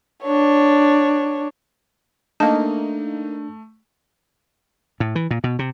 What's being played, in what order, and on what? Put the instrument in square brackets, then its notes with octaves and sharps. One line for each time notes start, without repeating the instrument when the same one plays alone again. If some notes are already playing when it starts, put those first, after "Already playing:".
[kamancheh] D4 C#5
[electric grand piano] A3 [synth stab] A#3 D#4 [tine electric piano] D4 [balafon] A5
[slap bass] A2
E3
A#2
B2
C3